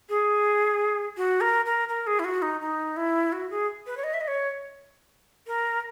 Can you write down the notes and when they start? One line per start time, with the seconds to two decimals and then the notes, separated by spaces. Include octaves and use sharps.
0.09 G#4
1.17 F#4
1.41 A#4
1.66 A#4
1.89 A#4
2.07 G#4
2.19 E4
2.24 F#4
2.42 D#4
2.61 D#4
2.97 E4
3.32 F#4
3.50 G#4
3.87 B4
3.97 C#5
4.04 D#5
4.14 E5
4.21 D#5
4.28 C#5
5.47 A#4